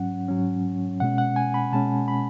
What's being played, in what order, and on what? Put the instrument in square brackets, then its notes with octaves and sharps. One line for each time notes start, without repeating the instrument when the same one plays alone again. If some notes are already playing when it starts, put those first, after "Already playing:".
Already playing: [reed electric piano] G#2 F#3 C#4 F#5
G#2 F#3 C#4
B2 G#3 C#4 F#5
F#5
G#5
B5
B2 G#3 C#4 A5
B5